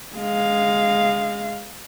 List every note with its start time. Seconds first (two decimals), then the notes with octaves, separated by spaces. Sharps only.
0.16 G#3 F5